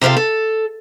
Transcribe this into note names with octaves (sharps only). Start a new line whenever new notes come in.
C3 C4 F4 A4 F5
A4